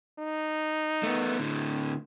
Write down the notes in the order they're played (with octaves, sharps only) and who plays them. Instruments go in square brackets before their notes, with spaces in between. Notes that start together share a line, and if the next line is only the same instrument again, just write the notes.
[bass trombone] D#4
[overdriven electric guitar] A3 B3
A2 D3